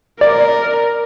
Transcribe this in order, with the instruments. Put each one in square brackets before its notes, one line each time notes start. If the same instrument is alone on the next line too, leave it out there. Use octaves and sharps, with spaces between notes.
[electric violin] A#4 [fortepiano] D5